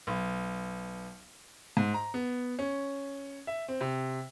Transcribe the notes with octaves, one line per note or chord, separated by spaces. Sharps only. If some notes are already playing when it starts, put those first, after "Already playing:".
B1
G#2
A#5
B3
C#4
E5
C4
C3